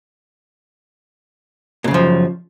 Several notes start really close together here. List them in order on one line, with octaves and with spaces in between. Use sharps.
A#2 C#3 F#2 F3